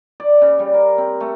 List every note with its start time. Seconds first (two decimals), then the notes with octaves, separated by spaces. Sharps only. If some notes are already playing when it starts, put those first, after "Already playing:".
0.20 D5
0.42 C#3
0.59 G3
0.74 A#4
0.98 C4
1.21 A3